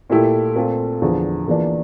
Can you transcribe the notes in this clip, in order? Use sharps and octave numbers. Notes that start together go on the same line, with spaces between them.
A#2 A3 E4 G4
A#2 A3 C4 F4
E2 D3 F3
E2 E3 A#3 D4 F4